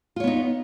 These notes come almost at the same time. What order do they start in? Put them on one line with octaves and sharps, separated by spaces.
F4 C#5 B3 D#4